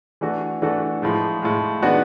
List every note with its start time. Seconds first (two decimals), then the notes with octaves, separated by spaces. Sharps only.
0.21 E3 A3 D4 F#4 A4
0.62 E3 A3 D4 F#4 A4
1.02 A2 F3 G#3
1.42 A2 F3 G#3
1.82 D#3 G#3 B3 D4 F#4